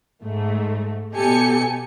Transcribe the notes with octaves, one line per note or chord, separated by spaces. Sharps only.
G#2 A3
B2 G4 A4 G#5 C#7